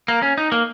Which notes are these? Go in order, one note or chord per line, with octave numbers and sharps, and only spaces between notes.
A#3
C#4
D#4
A#3